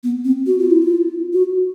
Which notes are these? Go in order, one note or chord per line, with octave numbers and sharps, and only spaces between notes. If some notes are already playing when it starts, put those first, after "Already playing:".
B3
C4
F#4
F4
E4
F4
F#4